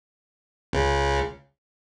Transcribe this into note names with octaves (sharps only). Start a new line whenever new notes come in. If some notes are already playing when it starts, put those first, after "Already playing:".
C#2 C#3